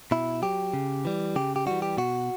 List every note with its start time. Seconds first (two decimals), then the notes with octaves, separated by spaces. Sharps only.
0.11 B2 E4
0.42 F#3 G4
0.74 C#3
1.05 E3 G3
1.36 C#3 G4
1.56 G4
1.67 E3 G3 F#4
1.82 G4
1.97 B2 F#4